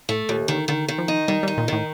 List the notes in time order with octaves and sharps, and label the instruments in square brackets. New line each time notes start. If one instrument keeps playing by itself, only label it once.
[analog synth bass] A2 [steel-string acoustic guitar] A3
[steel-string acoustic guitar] D#2 [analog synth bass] A#2
[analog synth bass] D3 [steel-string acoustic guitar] D#3
[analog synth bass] D3 [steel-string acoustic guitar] D#3
[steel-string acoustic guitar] D#3
[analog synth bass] F3
[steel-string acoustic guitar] D#4
[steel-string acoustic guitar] D#3 [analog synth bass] G3
[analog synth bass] G3 [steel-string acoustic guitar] D#4
[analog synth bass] A#2
[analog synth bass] A2 [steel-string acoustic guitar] D#3